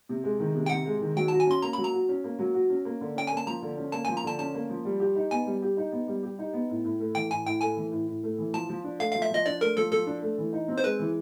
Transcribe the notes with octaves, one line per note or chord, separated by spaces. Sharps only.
C3
G#3
D#3
C3
G5
C3 F#5
G#3
D#3
F#3 G5
F#4 A5
G#5
C#4 C6
A#3 A#5
F#3 B5
A#5
F#4
C#4
A#3
F#3
F#4
C#4
A#3
D3
C#4 G5
A#3 G#5
A5
F3 A#5
D3
C#4
A#3 A5
F3 G#5
A#5
D3 A5
C#4 A5
A#3
F3
G3
G4
D#4
B3 G#5
G3
G4
D#4
B3
G3
G4
D#4
B3
A2
A2
A3
E3 G5
A2 G#5
A2 G5
A3 G#5
E3
A2
A2
A3
E3
F3 A5
F3
D4
A3 F5
F3 F5
E5
F3 D#5
D4 D5
A3 A#4
F3 A4
F3 A4
D4
A3
E3
D#4
C4
C5
G#3 B4
E3